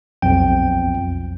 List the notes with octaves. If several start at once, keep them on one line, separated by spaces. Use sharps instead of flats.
B1 F2 G5